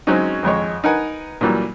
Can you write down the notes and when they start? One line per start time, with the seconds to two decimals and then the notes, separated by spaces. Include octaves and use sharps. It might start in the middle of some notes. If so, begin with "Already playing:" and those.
0.07 F#3 G#3 C4 C#4 D#4
0.43 G#1 F2 G#3 C#5
0.84 D#4 A#4 B4 F#5 G#5
1.41 A#2 E3 F#3 G3